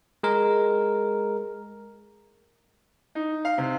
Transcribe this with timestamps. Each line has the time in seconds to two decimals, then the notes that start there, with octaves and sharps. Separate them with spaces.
0.23 G#3 A#4
3.15 D#4
3.45 F5
3.58 C3